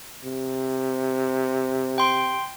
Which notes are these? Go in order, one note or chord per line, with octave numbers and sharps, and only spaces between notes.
C3
G5 C6